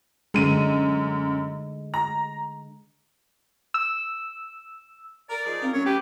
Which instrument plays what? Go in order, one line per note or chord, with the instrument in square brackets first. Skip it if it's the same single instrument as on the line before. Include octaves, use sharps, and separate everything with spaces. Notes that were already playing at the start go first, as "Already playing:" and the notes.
[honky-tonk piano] F#2 D#7 [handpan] D3 G#3
[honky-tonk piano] A#5
[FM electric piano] E6
[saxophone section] A#4 [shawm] D5
[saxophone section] F3 D#4 G#4
[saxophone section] D#3 F4 A#4 [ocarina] C4
[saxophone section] A2 F#3 [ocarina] C#4 [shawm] C#5
[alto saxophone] G4 [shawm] B4